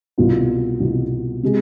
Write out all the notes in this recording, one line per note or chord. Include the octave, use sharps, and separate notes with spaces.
C2 B2 B3 F4
C2 B2 B3 F4
C3 G#3